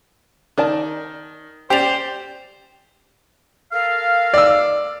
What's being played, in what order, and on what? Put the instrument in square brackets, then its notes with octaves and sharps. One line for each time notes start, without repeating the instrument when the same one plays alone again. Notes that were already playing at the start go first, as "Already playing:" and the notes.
[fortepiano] D#3 [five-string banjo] D#4 D5 A5
[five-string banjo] C#4 [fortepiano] G4 D5 [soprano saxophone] C5 [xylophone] G5 F7
[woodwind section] A4 A#4 F5
[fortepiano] D5 E6